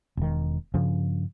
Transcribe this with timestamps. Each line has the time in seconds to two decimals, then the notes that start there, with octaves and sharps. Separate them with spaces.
0.17 E1 D#3
0.74 G2 C#3 F3 C#4